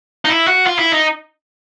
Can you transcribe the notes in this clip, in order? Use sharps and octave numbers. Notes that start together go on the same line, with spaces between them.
D#4
E4
F#4
F4
E4
D#4